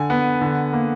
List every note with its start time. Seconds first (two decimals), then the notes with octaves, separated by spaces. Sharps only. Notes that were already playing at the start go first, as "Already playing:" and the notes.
Already playing: D3 G#5
0.10 B3
0.41 D3
0.73 A#3